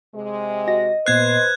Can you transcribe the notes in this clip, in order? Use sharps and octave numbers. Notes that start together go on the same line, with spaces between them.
C3 G#3
F#4 D#5 A#6
A#2 B3 B4 C5 F#6 G#6 C7